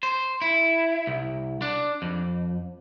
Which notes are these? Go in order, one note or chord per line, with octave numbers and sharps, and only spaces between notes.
C5
E4
C2
D4
F2